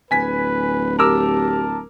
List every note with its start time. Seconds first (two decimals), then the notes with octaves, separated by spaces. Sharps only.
0.11 D1 B4 G#5 B6
0.99 G4 A#4 A5 D6 E6